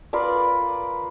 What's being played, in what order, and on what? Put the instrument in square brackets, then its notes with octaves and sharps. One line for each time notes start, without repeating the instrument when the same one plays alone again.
[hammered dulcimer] F4 A#4 B4 D5